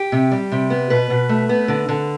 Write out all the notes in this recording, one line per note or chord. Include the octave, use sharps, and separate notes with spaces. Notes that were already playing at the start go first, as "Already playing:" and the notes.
Already playing: G4
C3
G3
C3
B3
B2 B4
B2
A3
B3
D3
D3